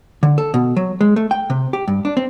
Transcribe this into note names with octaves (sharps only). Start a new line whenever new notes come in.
D3
A4
B2
F#3
G#3
A3
G5
C3
G4
G2
D4
C4